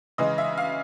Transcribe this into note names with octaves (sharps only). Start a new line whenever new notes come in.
C#3 E3 G#3 D#5
E5
F5